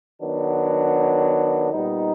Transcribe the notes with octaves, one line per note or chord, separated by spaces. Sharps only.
D#3 F#3 B3 D4
A#2 G3 B3 D#4